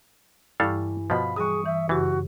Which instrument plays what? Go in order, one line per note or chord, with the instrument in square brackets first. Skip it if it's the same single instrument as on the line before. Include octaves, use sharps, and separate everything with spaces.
[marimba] G2 C#6 [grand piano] E3 [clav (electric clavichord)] G3 A4 F5
[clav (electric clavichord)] B2 F3 [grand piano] F5 B5
[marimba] E3 G3 F#6 [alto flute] G#4 [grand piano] C#6 D#6
[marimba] E3 [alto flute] E5
[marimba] F#2 C#3 G4 [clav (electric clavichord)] E3 [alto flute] F#4